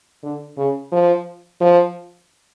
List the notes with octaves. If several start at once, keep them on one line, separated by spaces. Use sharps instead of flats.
D3
C#3
F3
F3